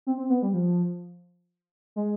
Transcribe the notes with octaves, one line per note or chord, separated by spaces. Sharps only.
C4
C4
B3
G3
F3
G#3